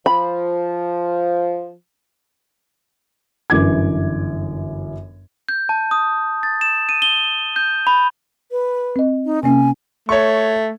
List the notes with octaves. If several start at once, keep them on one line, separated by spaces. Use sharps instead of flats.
F3 B5
G1 F#2 E3 D6 G#6
G6
A5
D#6
A6
E7
D#7
G7
G6
B5
B4
C4 D#5
D#4
C3 A#3 C#4 G#5
A3 C#5 C#6